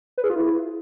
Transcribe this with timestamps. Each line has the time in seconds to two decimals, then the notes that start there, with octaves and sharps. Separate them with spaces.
0.18 B4
0.24 G#4
0.30 F4
0.36 E4